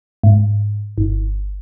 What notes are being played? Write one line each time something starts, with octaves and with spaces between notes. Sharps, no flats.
G#2
G1